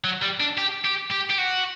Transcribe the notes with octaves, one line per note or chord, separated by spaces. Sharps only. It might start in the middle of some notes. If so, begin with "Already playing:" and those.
F#3
G3
D4
G4
G4
G4
G4
F#4